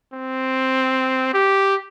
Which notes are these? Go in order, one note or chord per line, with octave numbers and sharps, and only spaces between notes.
C4
G4